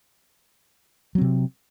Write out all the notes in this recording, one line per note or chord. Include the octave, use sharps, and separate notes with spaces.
C3 F#3 C4